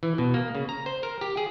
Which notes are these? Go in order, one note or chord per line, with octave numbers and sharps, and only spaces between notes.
E3
B2
A#3
C#3
A#5
C5
A#4
G4
G#4